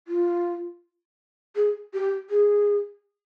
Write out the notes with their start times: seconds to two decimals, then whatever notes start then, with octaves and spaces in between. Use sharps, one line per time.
0.08 F4
1.56 G#4
1.94 G4
2.30 G#4